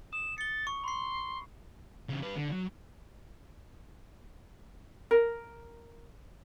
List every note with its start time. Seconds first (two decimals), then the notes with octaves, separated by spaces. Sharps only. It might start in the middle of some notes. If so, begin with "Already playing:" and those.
0.13 D#6 E7
0.38 A6 C#7 G7
0.67 C#6
0.84 B5 C6 C7
2.09 C#3 E3
2.22 G3 B4
2.36 D3
2.51 F#3
5.11 A#4